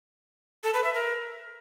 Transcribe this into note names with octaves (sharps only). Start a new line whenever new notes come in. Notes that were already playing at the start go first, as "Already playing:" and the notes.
A4
B4
E5
A#4